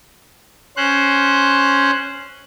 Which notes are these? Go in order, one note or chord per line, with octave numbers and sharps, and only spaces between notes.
C#4 C5 F#6